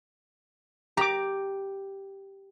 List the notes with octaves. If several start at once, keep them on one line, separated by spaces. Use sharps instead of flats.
G4 A#5 D6